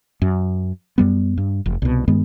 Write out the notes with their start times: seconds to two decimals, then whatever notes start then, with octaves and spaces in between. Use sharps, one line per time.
0.22 F#2
0.98 F#2 G3 B3
1.38 G2
1.66 F1
1.82 C2 B2
2.08 G2 D#3 G#3 B3